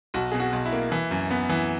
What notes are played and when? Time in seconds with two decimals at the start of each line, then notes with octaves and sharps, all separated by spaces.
0.14 B1 F#4
0.32 B2 G#4
0.40 F#4
0.53 B1
0.65 E4
0.73 A#3
0.92 E3
1.11 F#2
1.31 B3
1.50 E3